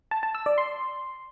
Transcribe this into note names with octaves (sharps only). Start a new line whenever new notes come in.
A5
A5
E6
D5
C6